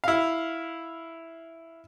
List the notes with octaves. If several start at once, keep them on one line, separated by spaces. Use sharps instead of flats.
E4 F5